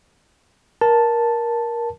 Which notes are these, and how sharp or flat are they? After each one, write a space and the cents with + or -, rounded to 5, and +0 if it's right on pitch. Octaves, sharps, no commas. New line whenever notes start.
A#4 +15 A5 +0